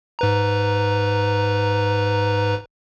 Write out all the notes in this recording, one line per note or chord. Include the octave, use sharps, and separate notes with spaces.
G#2 B4 A#5